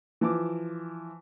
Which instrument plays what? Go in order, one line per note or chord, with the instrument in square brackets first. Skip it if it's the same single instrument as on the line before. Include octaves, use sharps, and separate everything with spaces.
[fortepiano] E3 F3 D6